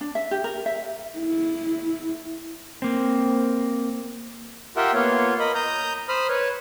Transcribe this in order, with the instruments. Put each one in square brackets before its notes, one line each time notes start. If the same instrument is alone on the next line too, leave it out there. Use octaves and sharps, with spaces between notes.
[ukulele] D4
E5
G4
A#4
E5
[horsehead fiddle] E4
[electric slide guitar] A#3 C4
[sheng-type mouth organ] F4 G4 A#4 E5 F#5 G5
A#3 B3 F4 C#5
A#4 D#5 B5
A#5 D#6 G6
C5 B5 D#6 F6
B4 C#5